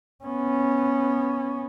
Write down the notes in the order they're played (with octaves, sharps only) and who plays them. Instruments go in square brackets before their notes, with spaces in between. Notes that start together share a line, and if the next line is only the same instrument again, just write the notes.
[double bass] B3 C#4